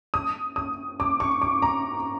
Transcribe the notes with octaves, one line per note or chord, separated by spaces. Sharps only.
D#6
D#6
D6
C#6
D6
A#5